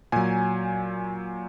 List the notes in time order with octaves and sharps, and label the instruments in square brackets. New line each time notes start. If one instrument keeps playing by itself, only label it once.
[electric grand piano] A#2 F#3 G#5